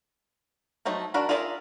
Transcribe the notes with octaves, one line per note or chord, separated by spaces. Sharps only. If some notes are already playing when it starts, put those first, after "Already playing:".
F3 F#3 A3 D#4
D4 F#4 A#4 B5
F4 G#4 A#4 D5 E5